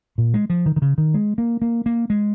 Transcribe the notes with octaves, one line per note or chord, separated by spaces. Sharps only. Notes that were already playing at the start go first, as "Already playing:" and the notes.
A#2
G#3
F3
D#3
D#3
C#3
D#3
G#3
A#3
A#3
A#3
G#3